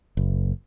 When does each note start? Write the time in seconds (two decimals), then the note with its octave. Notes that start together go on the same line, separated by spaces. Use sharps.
0.17 F#1